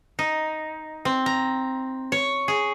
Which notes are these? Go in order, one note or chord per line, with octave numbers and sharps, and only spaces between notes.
D#4
C4
A#5
C#5
G#4